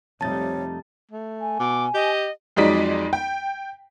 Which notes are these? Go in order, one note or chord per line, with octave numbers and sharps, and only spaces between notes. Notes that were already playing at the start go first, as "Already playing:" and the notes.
F2 C3 G3 A3 D#4 C#5 A5 A6
A3
G#5
B2 D6
G4 D#5
F2 F#3 G#3 D#4 D5 B6
G5